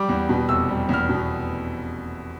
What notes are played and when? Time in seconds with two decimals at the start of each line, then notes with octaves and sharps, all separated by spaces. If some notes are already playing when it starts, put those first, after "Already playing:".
Already playing: G3 D6
0.09 E2
0.29 B2
0.49 F1 E6
0.69 G3
0.89 E2 F6
1.09 B2